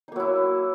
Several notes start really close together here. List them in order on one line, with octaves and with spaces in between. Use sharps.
D#4 A#3 F#3 E4